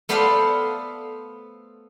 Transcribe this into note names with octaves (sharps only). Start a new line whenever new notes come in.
A3 B3 A4 C5 D5 F5